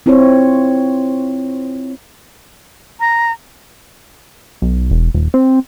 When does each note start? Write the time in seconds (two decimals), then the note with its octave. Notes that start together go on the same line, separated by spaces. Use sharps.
0.06 C4 E4 F4 C5 C#5
3.00 A#5
4.62 B1
4.91 E1
5.14 D#1
5.34 C4